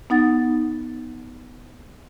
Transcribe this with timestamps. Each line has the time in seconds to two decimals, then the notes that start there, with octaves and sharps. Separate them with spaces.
0.10 B3 D#4 F#5 A6